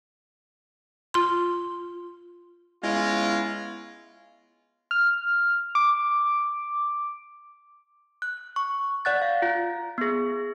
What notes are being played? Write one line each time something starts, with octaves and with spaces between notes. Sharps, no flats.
F4 C6
G#3 B3 C#4 E4 F4
F6
D6
F#6
C#6
D5 F#5 F#6 A6
F5
F4
B3 G#4